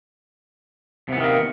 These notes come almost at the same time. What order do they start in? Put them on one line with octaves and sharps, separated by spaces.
C3 B3 E3 D#3 A#3